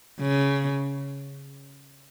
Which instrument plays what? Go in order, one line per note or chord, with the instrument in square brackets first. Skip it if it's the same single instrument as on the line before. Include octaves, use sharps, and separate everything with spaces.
[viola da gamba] C#3